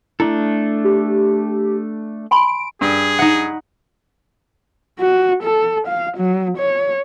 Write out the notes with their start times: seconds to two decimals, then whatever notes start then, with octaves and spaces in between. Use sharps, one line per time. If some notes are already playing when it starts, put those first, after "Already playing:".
0.20 A3 D4 E4 A4
0.84 G4
2.31 G#5 B5 C6 D7
2.81 G2 G#4
3.19 D#4 F#5
5.00 F#4
5.44 A4
5.88 F5
6.18 F#3
6.58 C#5